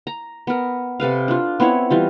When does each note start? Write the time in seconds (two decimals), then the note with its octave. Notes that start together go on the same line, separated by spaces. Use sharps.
0.07 A#5
0.47 B3 A#4
1.00 C3 A4 B4 F5
1.28 D4 F4
1.60 B3 C4 E4 C#5
1.90 E3 G3 F4